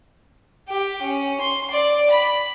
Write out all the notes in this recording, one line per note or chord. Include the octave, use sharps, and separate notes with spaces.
G4
C#4
C6
D5
B5